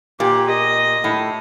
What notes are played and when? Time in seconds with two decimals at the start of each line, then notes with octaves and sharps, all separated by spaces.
0.20 A#2 G4
0.48 D#5
1.04 A2